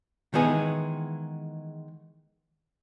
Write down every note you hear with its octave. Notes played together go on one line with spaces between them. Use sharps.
D#3 E3 G#3 B3 G#4